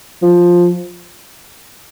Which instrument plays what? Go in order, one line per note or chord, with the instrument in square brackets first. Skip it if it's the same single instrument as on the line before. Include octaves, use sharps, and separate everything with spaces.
[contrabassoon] F3